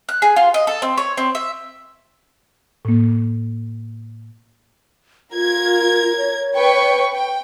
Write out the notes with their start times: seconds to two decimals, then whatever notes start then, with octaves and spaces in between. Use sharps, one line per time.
0.09 F#6
0.22 G#4
0.36 F4
0.54 D#5
0.67 A4
0.82 C4
0.97 C#5
1.17 C4
1.35 E5
2.85 A2 A#3
5.32 F4 A#4 G#6
6.16 C#5
6.55 B4 G5 C#6
7.12 G5